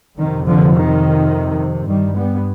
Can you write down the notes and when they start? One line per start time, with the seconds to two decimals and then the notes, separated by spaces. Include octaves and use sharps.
0.18 F2 C3 D#3
0.46 D3 F3
0.75 D#3
1.88 G2 D#3 G3
2.17 G3 B3